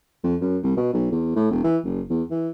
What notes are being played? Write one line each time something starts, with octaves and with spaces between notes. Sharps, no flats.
F2
F#2
C2
B2
B1
E2
A2
E1
E3
F#1
E2
E3